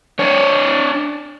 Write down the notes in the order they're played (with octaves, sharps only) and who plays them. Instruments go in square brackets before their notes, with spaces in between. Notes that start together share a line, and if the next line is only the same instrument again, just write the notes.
[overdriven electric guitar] D4 C#5